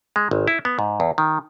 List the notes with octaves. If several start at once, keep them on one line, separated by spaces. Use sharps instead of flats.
G#3
G#1
E4
B3
G#2
E2
D#3